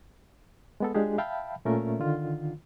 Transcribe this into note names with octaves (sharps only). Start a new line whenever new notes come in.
G#3 B3 A4
G#3 D4 F4 G4 G#4
E5 F5 G5 A5 B5
A#2 A3 C#4 F4 A#4 E5
D3 D#3 F4